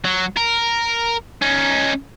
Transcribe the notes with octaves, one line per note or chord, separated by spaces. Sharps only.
F#3
A#4
C#4 D#4